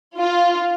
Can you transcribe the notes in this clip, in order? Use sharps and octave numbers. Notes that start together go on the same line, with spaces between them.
F4